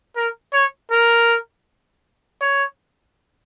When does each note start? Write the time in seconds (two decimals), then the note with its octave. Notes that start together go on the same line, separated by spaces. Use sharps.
0.16 A#4
0.53 C#5
0.91 A#4
2.41 C#5